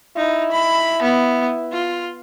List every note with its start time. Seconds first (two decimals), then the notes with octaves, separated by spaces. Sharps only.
0.17 D#4 E4
0.52 B5
1.02 B3
1.72 F4